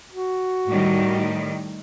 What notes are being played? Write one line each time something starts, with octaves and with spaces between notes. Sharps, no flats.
F#4
A2 D#3 G3